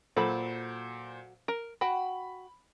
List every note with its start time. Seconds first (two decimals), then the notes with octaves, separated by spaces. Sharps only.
0.16 A#2 F#3 A4 C5 B5
1.48 A#4
1.81 F#4 F#5 G5 B5